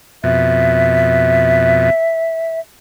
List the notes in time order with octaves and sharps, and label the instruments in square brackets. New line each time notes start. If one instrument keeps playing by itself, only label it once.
[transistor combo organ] F2 B2 [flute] E5